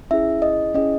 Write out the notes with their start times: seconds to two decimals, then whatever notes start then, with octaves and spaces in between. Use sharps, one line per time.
0.11 C#4 E4 G#4 E5
0.42 D#5
0.74 C#4 E4 G#4 D#5